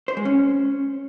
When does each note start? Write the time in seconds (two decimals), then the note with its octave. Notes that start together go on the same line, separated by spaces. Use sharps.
0.08 C5
0.17 G#3
0.25 C#4